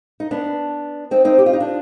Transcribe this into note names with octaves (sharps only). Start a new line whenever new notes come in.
D#4
B3 D4
C4 D#4
C4 D#4
G4
F4
D#4
D4 F4